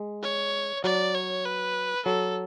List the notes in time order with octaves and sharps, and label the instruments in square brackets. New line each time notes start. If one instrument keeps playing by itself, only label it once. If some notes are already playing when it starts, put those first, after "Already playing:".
Already playing: [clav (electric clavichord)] G#3
[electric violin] C#5
[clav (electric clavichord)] F#3 [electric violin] D5
[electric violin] C#5
B4
[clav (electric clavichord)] F#3 [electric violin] A4